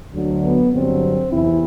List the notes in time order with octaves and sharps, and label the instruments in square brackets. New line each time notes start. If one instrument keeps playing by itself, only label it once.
[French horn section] D2 D3 F#3
B3
G2 D3 F#3 C4
E2 C3 E3 E4